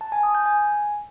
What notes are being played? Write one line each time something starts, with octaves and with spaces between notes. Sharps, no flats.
A5
G#5
D#6
G6
G#5